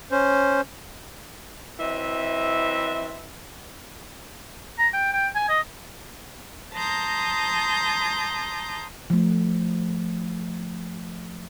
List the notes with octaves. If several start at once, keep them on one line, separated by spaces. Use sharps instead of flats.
C#4 C5
E3 F#3 C4 D#5 E5
A#5
G5
G5
G#5
D#5
A5 A#5 C6 D#6 G6 A#6
F3 A3